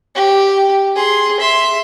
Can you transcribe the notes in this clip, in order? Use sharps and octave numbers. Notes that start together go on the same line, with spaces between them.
G4
G#4 C6
E5 C6